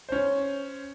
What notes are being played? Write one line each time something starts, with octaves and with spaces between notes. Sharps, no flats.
C#4 C5